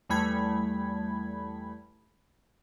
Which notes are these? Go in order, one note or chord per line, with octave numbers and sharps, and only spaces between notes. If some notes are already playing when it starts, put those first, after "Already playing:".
E2 G3 A3 B5 G#6